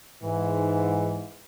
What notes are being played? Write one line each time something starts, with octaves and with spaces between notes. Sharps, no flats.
G#2 E3